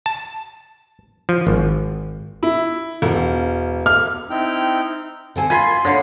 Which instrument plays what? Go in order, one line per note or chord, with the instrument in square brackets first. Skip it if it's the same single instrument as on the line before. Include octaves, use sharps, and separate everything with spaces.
[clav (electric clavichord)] A5
F3
G#1
[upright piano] E4
E1
F6
[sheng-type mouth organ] C4 D#4 E4 G5 F6
[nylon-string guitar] D3 C4 G#5
[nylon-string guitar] F4 [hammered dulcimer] G#5 B5 C6
[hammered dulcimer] D3 [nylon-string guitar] C#5 F5